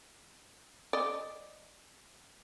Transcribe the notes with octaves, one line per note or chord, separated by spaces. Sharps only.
D5 D#5